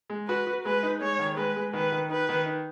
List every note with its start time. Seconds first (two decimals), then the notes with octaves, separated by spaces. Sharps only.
0.10 G#3
0.28 F#4 B4
0.47 F#4
0.65 G#3 B4
0.83 D#4
1.01 G#3 C#5
1.19 D#3
1.37 G#3 B4
1.56 G#3
1.73 D#3 B4
1.92 D#3
2.10 D#4 B4
2.29 D#3
2.46 D#4